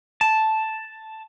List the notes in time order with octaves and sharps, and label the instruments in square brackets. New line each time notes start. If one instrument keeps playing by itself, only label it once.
[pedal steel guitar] A5